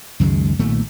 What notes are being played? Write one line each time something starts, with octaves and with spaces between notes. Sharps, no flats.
C#2 F#2 D#3 G#3
B1 A#2 D#3 A3